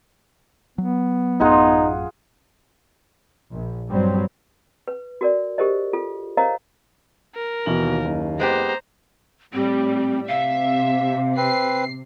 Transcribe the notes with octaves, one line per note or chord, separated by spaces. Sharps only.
F#3 B3
A1 F#2 D#4 F4 G#4 F#5
A#1
G2 F#3 G3 C4
B4
F#4 A#4 D5
G4 A4 A#4 C5 D#5
F4 A4
A#4 C5 C#5 D#5 F5 A#5
A#4
D#2 B2 E3 F#7
F#1
G#3 B3 G4 C5 A#5
A2 G3 C4
C3 E5 F5
C4 B4 C7